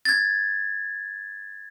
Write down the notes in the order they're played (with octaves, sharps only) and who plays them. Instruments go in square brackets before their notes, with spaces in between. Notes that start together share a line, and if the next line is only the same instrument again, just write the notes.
[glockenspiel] G#6 A6